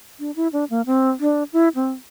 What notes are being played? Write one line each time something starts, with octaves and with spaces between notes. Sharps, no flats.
D4
E4
D4
A#3
C4
D4
E4
C4